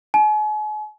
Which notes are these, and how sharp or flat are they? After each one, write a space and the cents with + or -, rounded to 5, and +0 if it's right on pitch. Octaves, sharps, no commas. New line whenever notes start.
G#5 +40